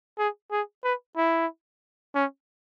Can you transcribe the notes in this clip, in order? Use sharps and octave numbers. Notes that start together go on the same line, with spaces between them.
G#4
G#4
B4
E4
C#4